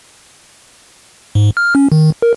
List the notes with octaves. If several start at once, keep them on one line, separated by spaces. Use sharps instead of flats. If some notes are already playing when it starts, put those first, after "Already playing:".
G#2
F6
C#4
D#3
A#4